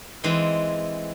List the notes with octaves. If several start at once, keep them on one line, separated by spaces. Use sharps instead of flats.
E3 G#3 C4